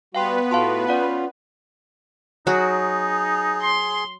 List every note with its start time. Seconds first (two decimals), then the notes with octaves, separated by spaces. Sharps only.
0.15 G3 B3 F#4 B4 F5 G5 C6
0.51 A2 F4 F#4 F5 A5 C6
0.88 C#4 F4 D5 F#5
2.47 F#3 D#4 F#4 G#4
3.62 C6